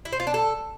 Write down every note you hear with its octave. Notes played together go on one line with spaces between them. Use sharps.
E4
C5
F4
D4
A4